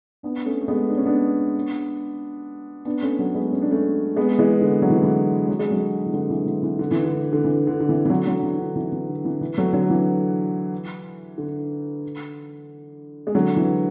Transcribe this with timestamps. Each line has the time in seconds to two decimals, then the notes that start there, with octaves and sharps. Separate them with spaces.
0.23 B3 D4
0.46 A3 C#4
0.61 A3
0.68 G#3 B3
0.90 D4
0.97 C#4
1.06 B3 D4
2.85 B3 D4
3.02 A3 C#4
3.19 F#3 A3
3.34 G#3 B3
3.52 C#4
3.62 D4
3.71 A3 C#4
4.16 G#3 B3
4.39 E3 G#3
4.61 D3
4.82 F#3
4.90 E3
4.96 D3
5.04 E3
5.48 F#3
5.59 G#3
5.71 D3 F#3
6.06 E3
6.13 D3 F#3
6.30 E3
6.46 E3
6.63 E3
6.79 D3
6.91 E3
7.04 D3
7.33 D3
7.44 E3
7.67 D3
7.80 D3
7.89 E3
8.05 E3
8.09 D3 F#3
8.26 D3 F#3
8.43 E3
8.59 D3
8.76 E3
8.92 E3
9.08 D3
9.25 E3
9.41 E3
9.58 F#3 A3
9.73 D3 F#3
9.90 E3
11.38 D3
13.27 G#3
13.35 D3 F#3
13.56 E3